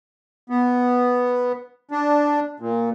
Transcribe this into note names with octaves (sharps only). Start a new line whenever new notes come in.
B3
D4
A#2